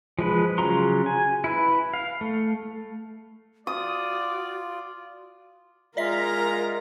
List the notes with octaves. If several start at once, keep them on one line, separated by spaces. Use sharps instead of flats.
F3 G#3 B4
C#3 F#3 F4 A#5 C6
G#5
E4 B4
F5
A3
F4 F#4 D5 D#6
G#3 F4 A#4 D5 E5 F5 A#5 B6